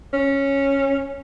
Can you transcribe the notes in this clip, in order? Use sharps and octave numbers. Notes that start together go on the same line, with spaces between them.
C#4